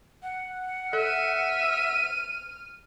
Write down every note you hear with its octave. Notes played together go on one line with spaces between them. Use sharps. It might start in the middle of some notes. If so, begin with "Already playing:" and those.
F#5
A4 E5 F6 D#7